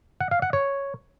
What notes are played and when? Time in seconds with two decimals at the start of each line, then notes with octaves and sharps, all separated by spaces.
0.21 F#5
0.31 F5
0.42 F#5
0.53 C#5